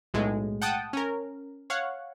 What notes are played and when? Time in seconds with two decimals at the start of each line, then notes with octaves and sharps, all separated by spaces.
0.14 B1 A2 G#3
0.62 F#5 G5 A5 D#6
0.93 C#4 A#4
1.70 C#5 F5 F#5